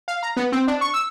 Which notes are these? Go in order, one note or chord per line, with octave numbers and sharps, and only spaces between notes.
F5
A#5
B3
C4
D4
C#6
E6